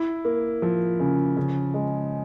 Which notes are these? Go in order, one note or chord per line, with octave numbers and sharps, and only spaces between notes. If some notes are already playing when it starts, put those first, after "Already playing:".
Already playing: E4
A#3
F3
C#3
C#3
G#3